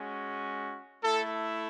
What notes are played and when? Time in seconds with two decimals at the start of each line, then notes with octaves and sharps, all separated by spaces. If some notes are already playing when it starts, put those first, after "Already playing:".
Already playing: G#3 C#4 F#4
1.04 A3 E4 A4